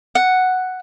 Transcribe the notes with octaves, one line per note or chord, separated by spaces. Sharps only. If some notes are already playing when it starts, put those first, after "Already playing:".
F#5